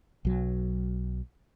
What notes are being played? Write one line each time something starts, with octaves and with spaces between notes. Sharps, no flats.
B1 F#3